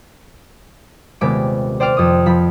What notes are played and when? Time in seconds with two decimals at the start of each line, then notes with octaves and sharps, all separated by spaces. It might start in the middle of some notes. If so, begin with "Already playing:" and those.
1.21 D#1 C3 G#3 B3 B5 D6
1.80 C5 D5 G5 D6 F6 C7
1.97 F2 D#6
2.26 F3 B5